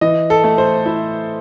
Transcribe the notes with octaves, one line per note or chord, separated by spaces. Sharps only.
E3 D#5
A4
A3
C5
E4